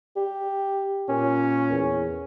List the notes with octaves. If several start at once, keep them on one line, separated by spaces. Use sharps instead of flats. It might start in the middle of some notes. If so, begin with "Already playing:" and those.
G4
A#2 C#4
E2